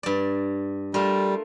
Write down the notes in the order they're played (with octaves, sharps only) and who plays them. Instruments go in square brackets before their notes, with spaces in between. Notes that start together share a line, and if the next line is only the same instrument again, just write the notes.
[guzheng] G2 D5
[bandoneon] G3 [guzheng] A3 F4 A#4